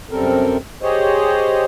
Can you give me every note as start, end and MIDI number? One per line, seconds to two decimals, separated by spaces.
0.11 0.57 42
0.11 0.57 48
0.11 0.57 55
0.11 0.57 60
0.11 0.57 69
0.11 0.57 70
0.82 1.65 67
0.82 1.65 68
0.82 1.65 72
0.82 1.65 73
0.82 1.65 75